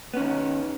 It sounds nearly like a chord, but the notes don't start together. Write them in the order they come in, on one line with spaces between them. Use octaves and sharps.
B3 C#4 D#3